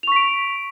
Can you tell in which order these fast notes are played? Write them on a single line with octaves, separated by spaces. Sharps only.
F7 C#6 B6 D7